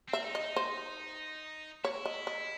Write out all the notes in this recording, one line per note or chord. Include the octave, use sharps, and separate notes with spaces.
C4 E5
D#4
D#5
D#4
C5
E4 C#5
D#5
D#5